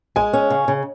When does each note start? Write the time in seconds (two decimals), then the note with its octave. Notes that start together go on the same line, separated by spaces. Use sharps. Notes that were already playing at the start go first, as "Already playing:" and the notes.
0.16 G#3 G#5
0.33 C#4
0.50 C#3
0.68 C#3